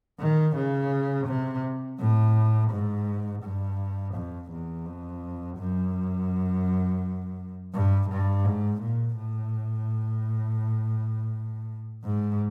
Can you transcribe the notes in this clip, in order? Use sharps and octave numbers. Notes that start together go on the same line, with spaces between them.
D#3
C#3
C3
A2
G#2
G2
F2
E2
F2
F#2
G2
G2
G#2
A#2
A2
G#2